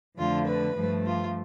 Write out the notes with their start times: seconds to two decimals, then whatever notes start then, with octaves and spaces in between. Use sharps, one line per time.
0.17 F2 D3 A3 F4
0.46 B4
0.76 G2 F3 A3
1.05 F4